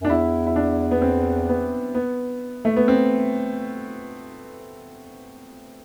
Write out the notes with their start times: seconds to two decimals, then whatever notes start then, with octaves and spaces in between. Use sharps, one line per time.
0.01 F#2
0.05 D4
0.09 E2 E4
0.47 E4
0.56 D4
0.91 B3
1.02 C4
1.49 B3
1.95 B3
2.65 A3
2.76 B3
2.88 C4